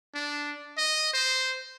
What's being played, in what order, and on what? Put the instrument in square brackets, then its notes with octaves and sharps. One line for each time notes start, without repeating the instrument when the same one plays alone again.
[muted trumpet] D4
D#5
C5